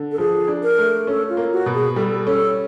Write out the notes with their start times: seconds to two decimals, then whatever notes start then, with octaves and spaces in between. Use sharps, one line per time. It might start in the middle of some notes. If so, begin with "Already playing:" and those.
Already playing: D3
0.12 A4
0.18 F3 G#4
0.48 D4
0.63 A#4
0.78 A3
1.07 C#4 A4
1.29 F4
1.37 A#3
1.52 F#4
1.66 B2
1.74 G#4
1.96 G3 A4
2.26 C#4 A4